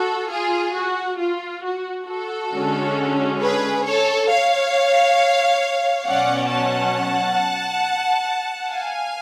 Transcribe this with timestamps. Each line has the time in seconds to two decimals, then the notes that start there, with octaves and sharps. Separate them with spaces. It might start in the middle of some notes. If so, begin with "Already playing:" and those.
Already playing: F#4 A4
0.31 F4 G#4
0.76 F#4
1.19 F4
1.65 F#4
2.09 F#4 A4
2.53 D3 G#3 C#4
3.41 G#4 B4
3.85 A4 C#5
4.29 C#5 F5
6.06 B2 F#3 C#4 D5 F#5
6.50 F#5 A5
8.71 F5 G#5